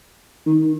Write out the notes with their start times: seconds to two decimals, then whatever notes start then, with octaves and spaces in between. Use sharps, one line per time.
0.46 D#3